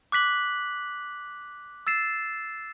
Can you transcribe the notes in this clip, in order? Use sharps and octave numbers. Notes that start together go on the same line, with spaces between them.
D6 F#6 B6 F#7
E6 A6 C7 E7